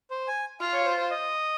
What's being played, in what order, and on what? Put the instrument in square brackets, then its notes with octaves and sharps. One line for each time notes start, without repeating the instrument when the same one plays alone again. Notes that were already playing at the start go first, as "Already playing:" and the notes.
[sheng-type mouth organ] C5
G#5
[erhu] F4 [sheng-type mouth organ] F5
[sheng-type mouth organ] C#5
C5
C5
D#5